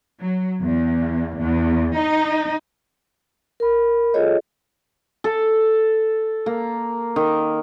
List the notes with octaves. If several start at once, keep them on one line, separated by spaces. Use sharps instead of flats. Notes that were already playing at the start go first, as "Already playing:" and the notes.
F#3
E2
E2
D#4
A#4 B5
F4 G#4 A4 C#5 D#5
A4
A#3
D#3